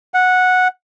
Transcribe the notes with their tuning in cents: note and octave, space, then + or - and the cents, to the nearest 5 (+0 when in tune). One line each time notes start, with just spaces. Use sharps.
F#5 -10